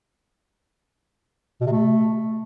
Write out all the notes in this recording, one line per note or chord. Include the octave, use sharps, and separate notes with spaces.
B2
C3
A3